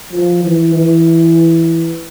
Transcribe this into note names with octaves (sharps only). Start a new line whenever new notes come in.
F3
E3
E3